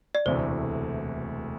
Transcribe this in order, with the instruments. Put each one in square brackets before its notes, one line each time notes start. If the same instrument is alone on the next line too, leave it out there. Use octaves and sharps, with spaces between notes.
[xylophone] D5
[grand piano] E1 D2 C3 E3 A3 [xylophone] C5